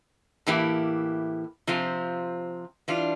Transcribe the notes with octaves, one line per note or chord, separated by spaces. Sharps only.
A2 E3 A#3 E4 G4
C3 F3 C4 F4
E3 G3 D4 F4